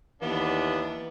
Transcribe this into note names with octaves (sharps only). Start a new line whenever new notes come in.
D#2 E3 B3 D4